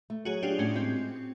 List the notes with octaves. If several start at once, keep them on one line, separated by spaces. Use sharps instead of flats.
A3
F#3 F#4 G#4
D4 F4 G4
A2 C#4
G#3 C4